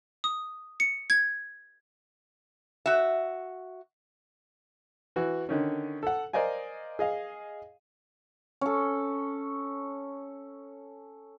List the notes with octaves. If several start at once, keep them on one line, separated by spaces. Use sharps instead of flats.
D#6
C#7
G#6
F#4 E5
E3 F#4
D3 D#3 C#4
A4 F#5
A#4 C5 D5 D#5 F5 G#5
G#4 D#5 F5
C#4 A4